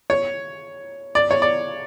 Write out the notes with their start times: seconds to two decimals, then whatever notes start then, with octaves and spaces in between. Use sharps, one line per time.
0.10 C#5
1.15 D5
1.31 C#5
1.42 D5